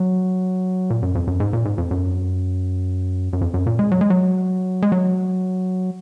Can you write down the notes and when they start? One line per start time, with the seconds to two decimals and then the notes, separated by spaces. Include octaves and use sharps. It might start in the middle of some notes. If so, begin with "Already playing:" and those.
Already playing: F#3
0.90 A#2
1.03 F#2
1.15 F2
1.27 F#2
1.40 G#2
1.53 A#2
1.65 G#2
1.78 F2
1.91 F#2
3.33 F#2
3.41 F2
3.54 F#2
3.67 A#2
3.79 G#3
3.92 F#3
4.01 G#3
4.10 F#3
4.82 G#3
4.92 F#3